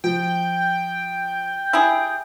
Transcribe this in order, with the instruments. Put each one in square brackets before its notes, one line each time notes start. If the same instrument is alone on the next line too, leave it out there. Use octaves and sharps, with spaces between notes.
[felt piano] F3 [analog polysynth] G5
[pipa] E4 G4 G#4